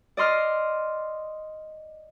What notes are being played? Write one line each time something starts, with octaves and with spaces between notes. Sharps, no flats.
D5 D#5 C6 F6